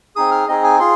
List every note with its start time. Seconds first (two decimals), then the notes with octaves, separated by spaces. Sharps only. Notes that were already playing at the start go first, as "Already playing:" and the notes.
0.16 C4 D#4 G#4 D#6
0.31 F6
0.48 C4 D#4 G#4 D#5
0.64 G#5
0.79 F4 G#4 C6